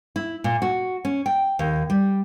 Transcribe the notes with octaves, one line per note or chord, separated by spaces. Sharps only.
E4
A#2
F#4
C#4
G5
D#2
G3